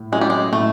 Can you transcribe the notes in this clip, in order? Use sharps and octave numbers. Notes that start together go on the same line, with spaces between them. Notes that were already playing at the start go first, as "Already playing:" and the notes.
Already playing: A2
F#3 G#3 A3 C#4 E4
G3
G#3
A2 A3